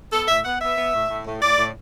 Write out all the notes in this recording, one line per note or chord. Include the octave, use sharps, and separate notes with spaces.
B3 A4
A2 E5
B3 F#5
B3 E5
B3
A2
A2
A2
A2 D5
A2